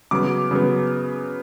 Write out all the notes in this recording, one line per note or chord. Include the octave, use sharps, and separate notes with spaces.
C#3 F#3 B3 D6
C#3 F#3 B3